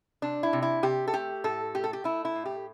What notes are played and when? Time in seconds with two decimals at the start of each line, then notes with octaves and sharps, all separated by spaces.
0.22 C3 D4
0.43 E4
0.53 C3
0.62 E4
0.83 C3 G4
1.08 A4
1.13 A3 G4
1.44 A2 A4
1.74 A3 G4
1.84 A4
1.93 G4
2.04 A3 E4
2.25 E4
2.35 A2
2.46 G4